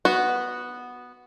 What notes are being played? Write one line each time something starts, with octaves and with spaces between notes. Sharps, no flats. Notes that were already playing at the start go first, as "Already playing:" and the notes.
B3 F#4